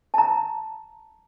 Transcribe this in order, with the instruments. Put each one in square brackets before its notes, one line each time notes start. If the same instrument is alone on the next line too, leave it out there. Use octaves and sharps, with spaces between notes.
[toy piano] A5 A#5